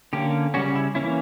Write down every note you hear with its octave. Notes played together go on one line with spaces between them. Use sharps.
D3 A#3 C#4 G4
C#3 G3 C#4 F#4
E4
E3 A#3 C#4 E4